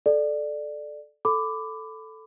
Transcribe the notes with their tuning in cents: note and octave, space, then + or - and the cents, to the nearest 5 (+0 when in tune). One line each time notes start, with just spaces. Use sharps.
A4 -15 D5 +15
A4 +0 B5 +25 D6 +0